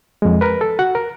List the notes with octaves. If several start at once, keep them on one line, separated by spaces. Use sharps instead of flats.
F2 G#3
A#4 B4
A4
F#4 F#5
A#4